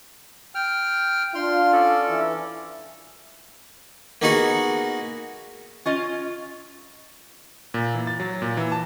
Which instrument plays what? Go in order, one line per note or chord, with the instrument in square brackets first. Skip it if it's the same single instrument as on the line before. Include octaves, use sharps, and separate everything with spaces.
[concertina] G5 F6
[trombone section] D4 F4 [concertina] C6 F6
[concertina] C#4 A4 D5
[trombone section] E3
[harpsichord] A#3 B3 D#4 F#4 G#4 F#5
[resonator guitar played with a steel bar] C#4 F4 D#5
[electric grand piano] A#2
E3
A6
F#3
A#2
E3
A5